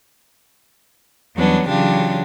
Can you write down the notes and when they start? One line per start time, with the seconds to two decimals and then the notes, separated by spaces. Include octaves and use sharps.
1.35 E2 F#3 G3 B3 C#4 D4
1.68 C#3 E3 F#3 D4 F4 G4